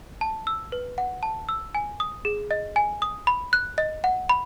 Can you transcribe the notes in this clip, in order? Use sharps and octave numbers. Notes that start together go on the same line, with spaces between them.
A5
E6
B4
F#5
A5
E6
G#5
D#6
G#4
D#5
G#5
D#6
B5
F#6
D#5
F#5
B5